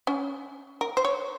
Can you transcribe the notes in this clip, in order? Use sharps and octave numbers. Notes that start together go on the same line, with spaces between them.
C#4
A#4
C5
C#5